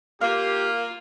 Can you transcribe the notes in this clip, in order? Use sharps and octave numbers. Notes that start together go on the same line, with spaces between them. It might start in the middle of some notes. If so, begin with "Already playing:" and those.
A#3 F4 G4 F5